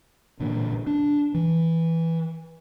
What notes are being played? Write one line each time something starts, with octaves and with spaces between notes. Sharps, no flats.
A1 A#2 D3
D4
E3